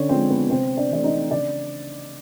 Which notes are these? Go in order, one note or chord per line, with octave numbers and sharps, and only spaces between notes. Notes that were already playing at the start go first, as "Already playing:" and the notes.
Already playing: D3 C#4 D4 C#5
F3 G#3 C4 C5
B3 B4
C3 C4 C5
D4 D5
E3 A3 D5
D#4 D#5
C#3 D4 D5